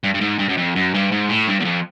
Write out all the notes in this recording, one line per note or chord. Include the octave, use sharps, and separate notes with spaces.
G2
G2
G#2
G2
F#2
F2
F#2
G2
G#2
A2
G2
E2
F2